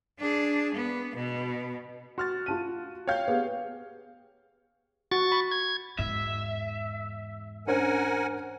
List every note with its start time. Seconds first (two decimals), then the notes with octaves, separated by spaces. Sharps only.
0.19 D4 G#4
0.74 B3
1.16 B2
2.18 F#4 C6 F6 A6
2.46 F4 A5 D#7
3.08 C#5 F5 G5 G6
3.28 B3 G4 G#4
5.11 F#4 C#6 A6
5.32 B5
5.51 G#6
5.99 E2 G#2 E5
7.67 C#4 D4 A#4 C5 F#5 G#5